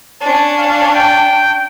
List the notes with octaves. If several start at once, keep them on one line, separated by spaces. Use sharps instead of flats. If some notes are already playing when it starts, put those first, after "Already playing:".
C#4 D4 A5
F5
G5